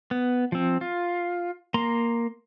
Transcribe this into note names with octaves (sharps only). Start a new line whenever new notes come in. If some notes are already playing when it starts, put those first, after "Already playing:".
B3
F3 C4
F4
A#3 A#5 C6